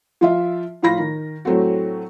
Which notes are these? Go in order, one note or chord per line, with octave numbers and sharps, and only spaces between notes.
F3 F4 E5
A2 F3 F4 B5 A#6
D#3
A2 F#3 A3 C4 F#4